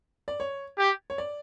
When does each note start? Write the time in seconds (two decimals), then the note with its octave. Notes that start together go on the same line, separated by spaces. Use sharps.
0.28 D5
0.40 C#5
0.78 G4
1.10 C#5
1.18 D5